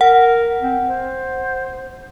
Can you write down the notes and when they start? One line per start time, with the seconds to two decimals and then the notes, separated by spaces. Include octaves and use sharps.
0.01 A#4 F#5
0.62 C4
0.88 C5